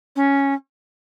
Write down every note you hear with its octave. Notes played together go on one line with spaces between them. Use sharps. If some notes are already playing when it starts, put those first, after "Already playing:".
C#4